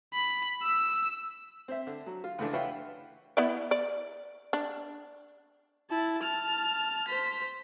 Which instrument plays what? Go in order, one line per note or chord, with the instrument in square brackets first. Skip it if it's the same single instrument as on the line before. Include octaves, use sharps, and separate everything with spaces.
[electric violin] B5
E6
[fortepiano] C4 C5 E5
D3
F#3
F4
C#2 D3 E3 A3 D4
F4 B4 C#5 E5 F#5 G5
[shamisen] B3 E4 D5
D5
D4
[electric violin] E4 A5
A5 F6
C5 B6